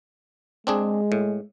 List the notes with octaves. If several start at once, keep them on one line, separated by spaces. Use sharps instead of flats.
G#3 C4 D4 G#4
A2